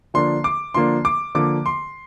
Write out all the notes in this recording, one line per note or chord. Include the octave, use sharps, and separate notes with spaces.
D3 F3 A#3 D4 C6
D6
D3 F3 A#3 D4 C6
D6
D3 F3 A#3 D6
C6